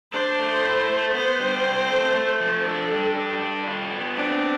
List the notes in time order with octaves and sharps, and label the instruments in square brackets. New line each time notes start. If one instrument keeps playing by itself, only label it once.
[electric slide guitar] D4 [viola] C5
[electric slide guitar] A3
E4
A3
[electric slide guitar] B3 [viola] C5
[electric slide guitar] G3
C4
A3
A3
F3
[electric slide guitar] D4 [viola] A4
[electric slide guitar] G3
D4
G3
F4
B3
[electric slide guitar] C4 [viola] D4